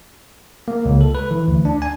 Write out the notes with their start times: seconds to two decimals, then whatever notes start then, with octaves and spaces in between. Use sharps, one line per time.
0.68 A#3
0.85 C#2
1.01 A4
1.15 B4
1.31 E3
1.48 D2
1.65 D4
1.82 G#5